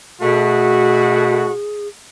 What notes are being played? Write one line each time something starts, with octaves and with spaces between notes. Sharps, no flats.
B2 A3 F#4 G#4